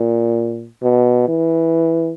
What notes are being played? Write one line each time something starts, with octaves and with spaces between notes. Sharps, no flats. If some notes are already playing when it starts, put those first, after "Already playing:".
Already playing: A#2
B2
E3